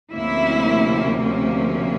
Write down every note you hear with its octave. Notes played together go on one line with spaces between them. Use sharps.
D2 C3 F3 A#3 C#4 E4 E5